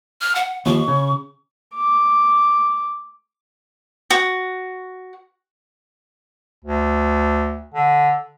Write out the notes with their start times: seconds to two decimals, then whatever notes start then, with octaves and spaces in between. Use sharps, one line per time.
0.21 F6
0.35 F#5
0.66 D#2 F3 C#6
0.88 C#3
1.74 D6
4.11 F#4
6.65 D2
7.74 D3